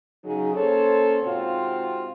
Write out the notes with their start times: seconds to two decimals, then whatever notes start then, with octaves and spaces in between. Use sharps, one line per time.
0.25 C#3 F#3 D#4 G#4
0.54 A#3 C#4 A4 C5 C#5
1.23 G#2 C3 C4 F4 F#4